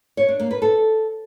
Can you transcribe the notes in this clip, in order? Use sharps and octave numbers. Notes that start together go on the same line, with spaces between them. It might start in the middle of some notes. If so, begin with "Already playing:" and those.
C#5
D4
A#3
B4
A4